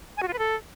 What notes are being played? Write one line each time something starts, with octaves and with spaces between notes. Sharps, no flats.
G#5
F#4
F4
B4
A4